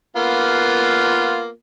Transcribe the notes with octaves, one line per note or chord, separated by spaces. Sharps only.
A#3 B3 F4